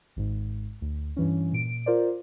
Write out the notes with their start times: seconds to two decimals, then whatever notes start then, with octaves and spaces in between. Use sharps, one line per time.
0.16 G#1 G#2
0.82 D2
1.16 G2 E3 C#4
1.52 A#2 D7
1.86 F4 A#4 C5 D5